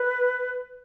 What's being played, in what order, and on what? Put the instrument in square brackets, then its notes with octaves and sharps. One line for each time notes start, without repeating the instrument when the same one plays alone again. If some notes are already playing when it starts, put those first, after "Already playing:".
Already playing: [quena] B4